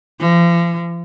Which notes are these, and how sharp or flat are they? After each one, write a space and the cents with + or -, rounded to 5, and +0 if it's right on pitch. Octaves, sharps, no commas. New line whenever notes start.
F3 -40